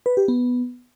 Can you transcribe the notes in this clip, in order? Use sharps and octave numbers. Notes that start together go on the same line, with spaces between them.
B4
G4
B3